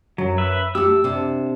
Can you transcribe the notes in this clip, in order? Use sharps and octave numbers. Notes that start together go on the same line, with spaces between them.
F#2 F#3
B4 E5
A3 G4 E6
C3 D4